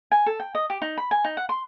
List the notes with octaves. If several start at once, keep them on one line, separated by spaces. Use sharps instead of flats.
G#5
A4
G5
D#5
G4
D#4
B5
G#5
D#4
F#5
C6